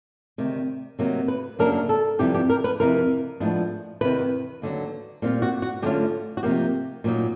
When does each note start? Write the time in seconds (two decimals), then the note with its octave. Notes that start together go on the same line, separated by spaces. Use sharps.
0.38 D2 C3 D#3
0.99 C3 D#3 F#3 A#3
1.28 B4
1.59 F#2 C#3 F#3 A#3 D4 A#4
1.89 A4
2.19 F2 C3 E3 G3 G4
2.34 G4
2.50 A#4
2.64 B4
2.80 F2 C3 E3 A#4
3.40 A2 F3 G#3 B3 D4
4.01 E2 C3 D#3 B4
4.62 D#2 D3 F#3
5.22 A#2 G3 C4 F4
5.42 F#4
5.62 F#4
5.82 D3 F#3 A3 C#4 F4 G4
6.37 F#4
6.43 C3 F3 A#3 D#4 G4
7.04 A#2 F#3 A#3 D#4